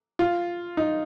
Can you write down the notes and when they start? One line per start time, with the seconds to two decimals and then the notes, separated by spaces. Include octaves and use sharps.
0.19 F4
0.77 D#4